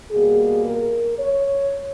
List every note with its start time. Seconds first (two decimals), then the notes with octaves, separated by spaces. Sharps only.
0.11 B2 G3 A#3 G#4
0.65 A#4
1.19 C#5